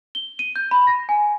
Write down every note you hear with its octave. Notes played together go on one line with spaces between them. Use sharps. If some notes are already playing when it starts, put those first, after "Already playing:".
G7
D#7
G6
B5
A#6
G#5